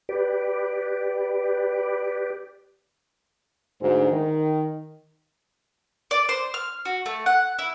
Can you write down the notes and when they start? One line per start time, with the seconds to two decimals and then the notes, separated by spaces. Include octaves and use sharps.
0.09 G4 B4 D5
3.81 D2 G#2
4.11 D#3
6.11 D5
6.29 C5
6.54 F6
6.85 F#4
7.06 A3
7.26 F#5
7.59 E4